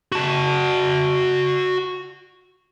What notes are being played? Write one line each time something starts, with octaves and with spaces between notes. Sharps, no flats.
F#4 A5